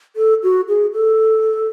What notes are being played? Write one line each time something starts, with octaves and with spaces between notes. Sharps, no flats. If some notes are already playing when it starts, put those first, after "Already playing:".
A4
F#4
G#4
A4